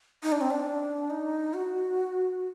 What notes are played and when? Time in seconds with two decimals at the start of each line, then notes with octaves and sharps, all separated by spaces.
0.23 D#4
0.32 D4
0.41 C4
0.51 D4
1.10 D#4
1.54 F#4